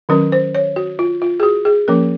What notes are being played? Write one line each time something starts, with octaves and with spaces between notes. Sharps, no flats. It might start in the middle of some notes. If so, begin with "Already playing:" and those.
D#3 F#3 C#4 A#4
C5
C#5
F#4
F4
F4
G#4
F#4
G#4
F3 A#3 C#4 A#4